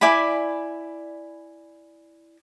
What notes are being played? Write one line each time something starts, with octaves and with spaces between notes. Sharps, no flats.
E4 D5 G#5 B5